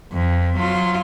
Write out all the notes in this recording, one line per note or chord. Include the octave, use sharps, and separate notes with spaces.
F2
F#3 F4